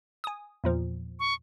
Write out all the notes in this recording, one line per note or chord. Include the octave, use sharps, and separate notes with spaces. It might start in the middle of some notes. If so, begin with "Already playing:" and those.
G#5 D#6
E2 A#2 F3
C#6